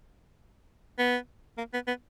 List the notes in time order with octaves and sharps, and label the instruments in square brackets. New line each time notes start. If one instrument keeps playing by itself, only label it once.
[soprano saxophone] B3
A#3
B3
B3